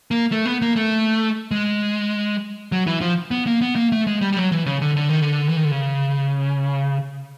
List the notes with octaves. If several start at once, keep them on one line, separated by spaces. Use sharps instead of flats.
A#3
A3
B3
A#3
A3
G#3
F#3
E3
F3
B3
A#3
B3
A#3
A3
G#3
G3
G3
F#3
E3
C#3
D3
D3
D#3
D3
E3
D#3
D3
C#3